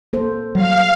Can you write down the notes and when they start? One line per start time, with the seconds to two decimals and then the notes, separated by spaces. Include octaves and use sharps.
0.13 A#3 A4 C5
0.55 F#3 G3 F5